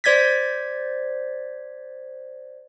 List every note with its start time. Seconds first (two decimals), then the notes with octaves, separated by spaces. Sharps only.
0.04 C5 D5 G#6 A6 B6